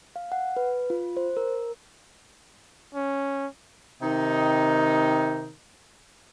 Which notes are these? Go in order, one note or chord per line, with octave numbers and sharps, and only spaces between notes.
F5
F#5
B4
F4
C5
A#4
C#4
C3 D#3 D#4